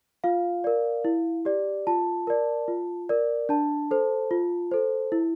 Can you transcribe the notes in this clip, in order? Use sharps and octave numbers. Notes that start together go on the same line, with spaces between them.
F4 F5
A#4 D5
E4
G4 D5
F4 A5
A#4 D5
F4
A#4 D5
D4 A5
A4 C5
F4
A4 C5
E4